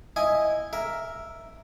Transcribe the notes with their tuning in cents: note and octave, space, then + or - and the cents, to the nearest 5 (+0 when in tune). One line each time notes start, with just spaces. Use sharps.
E4 +0 D#5 +0 G#5 +0
A#4 +0 E5 +0